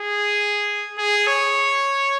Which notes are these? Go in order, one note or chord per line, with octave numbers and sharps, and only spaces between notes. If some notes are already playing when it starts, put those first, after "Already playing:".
Already playing: G#4
G#4
C#5